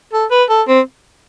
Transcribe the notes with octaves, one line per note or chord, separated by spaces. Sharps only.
A4
B4
A4
C4